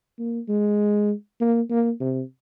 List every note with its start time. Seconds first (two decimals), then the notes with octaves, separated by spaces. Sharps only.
0.19 A#3
0.48 G#3
1.40 A#3
1.70 A#3
2.00 C3